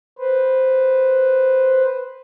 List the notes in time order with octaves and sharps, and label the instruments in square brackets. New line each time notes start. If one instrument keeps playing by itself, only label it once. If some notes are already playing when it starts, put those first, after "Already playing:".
[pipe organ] B4 C5